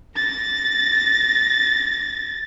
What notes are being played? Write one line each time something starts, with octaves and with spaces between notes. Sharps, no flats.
A6 A#6